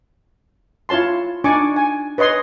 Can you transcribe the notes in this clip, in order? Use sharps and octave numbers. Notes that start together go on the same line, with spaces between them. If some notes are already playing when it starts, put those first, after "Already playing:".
E4 F4 C#5 A5 C6
D4 D#4 D5 G#5 C#6 D6
G#5
B4 C#5 D#5 C6